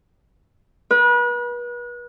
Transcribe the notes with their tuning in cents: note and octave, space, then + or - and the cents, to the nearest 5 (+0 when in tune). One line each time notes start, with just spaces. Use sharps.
B4 -35